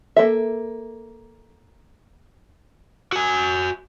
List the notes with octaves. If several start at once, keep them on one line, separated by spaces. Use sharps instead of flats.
A#3 A4 E5
F#4 G#5